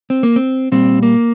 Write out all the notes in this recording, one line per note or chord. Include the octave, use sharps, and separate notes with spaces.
C4
A#3
C4
A#2 G3 C4
A#3